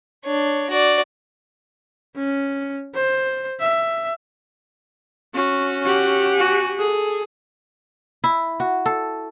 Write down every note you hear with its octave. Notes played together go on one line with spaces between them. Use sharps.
D4 C#5
F#4 D5
C#4
C5
E5
C#4 F#4
G4 F#5
F#4 G#5
G#4 A4
E4
F#4
A4